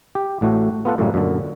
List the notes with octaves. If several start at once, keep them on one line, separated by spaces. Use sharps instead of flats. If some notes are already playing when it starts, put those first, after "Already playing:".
G4
A1 A2 A3 F#4
B3 F4 A4 F#5
F#2 A2 C#3 G3 G#3 A#3
F#2 A#2 D3